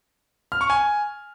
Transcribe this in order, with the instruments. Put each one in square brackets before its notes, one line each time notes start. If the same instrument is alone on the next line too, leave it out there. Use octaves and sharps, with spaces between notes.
[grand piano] F6
C#6
G#5